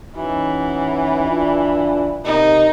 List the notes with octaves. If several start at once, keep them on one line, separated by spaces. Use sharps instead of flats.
E3 C#4 D#4 F#4
D4 F4 D5
C3 A#3 D#4 A#4